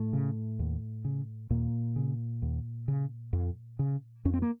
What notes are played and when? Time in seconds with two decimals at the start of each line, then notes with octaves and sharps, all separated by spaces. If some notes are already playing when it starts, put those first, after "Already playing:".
Already playing: A2 A3
0.13 C#3
0.59 D#2
1.05 C#3
1.50 D#2 A#2 A#3
1.96 C#3
2.42 D#2
2.88 C#3
3.33 F2
3.79 C#3
4.25 F2 C#4
4.34 C4
4.42 A#3